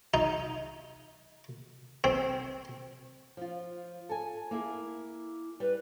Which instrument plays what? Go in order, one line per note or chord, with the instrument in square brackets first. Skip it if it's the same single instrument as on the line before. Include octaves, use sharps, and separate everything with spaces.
[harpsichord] D#4
C4
[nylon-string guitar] F3 F4
A4 G#5
A#3 E4 G#4
[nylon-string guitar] G3 [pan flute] B4